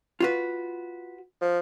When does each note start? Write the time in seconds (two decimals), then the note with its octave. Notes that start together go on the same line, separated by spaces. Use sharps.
0.20 F4 F#4 B4
1.41 F3